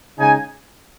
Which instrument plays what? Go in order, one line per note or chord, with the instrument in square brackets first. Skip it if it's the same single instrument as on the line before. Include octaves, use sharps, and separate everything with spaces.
[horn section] C#3 G#3 D#4 G#5